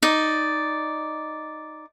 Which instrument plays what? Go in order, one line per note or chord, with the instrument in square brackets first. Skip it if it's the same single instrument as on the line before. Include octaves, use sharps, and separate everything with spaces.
[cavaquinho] D#4 D5